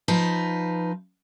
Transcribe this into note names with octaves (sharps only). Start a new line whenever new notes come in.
F3 D#4 B4